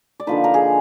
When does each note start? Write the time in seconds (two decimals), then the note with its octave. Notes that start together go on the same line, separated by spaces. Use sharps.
0.20 D5
0.27 D3 F3 A#3 D#4 B4
0.44 A#4
0.54 G#4